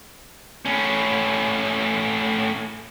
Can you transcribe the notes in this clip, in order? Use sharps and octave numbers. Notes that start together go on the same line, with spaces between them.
A2 C#4